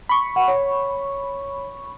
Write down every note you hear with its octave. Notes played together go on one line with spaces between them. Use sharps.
B5 C#6
F#5
C#5